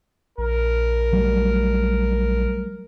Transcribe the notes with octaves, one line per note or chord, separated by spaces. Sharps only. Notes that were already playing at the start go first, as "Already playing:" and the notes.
A#1 A#4
F#3 G3 A3